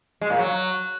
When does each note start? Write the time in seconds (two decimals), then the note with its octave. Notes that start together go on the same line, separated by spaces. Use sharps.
0.21 G#3
0.30 A#2
0.39 F#3